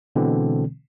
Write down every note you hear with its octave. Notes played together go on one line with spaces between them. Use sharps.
B2 D3 E3 G#3 C4